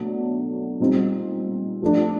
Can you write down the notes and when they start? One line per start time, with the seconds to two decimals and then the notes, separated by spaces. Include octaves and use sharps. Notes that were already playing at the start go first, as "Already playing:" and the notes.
Already playing: B2 F#3 A3 D4
0.80 A#2 G3 C4 D#4
1.82 F3 A3 D4